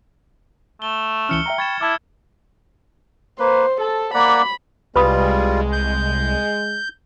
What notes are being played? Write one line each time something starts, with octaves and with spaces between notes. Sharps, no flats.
A3 G7
C#2 E3 C#4 F6 C#7 G7
E5 G5 A#5
G5 B5 C#6 G#6 A6 E7
E4 A5 D6
A#3 B4 C5
A4 A5
A#3 D5 F#5 B5
C2 G3 G#3 F4 B4 B5 D#6
G6